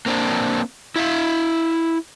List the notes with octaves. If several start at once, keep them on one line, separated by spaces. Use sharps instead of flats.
A#3 C4 D4
E4 E5 F5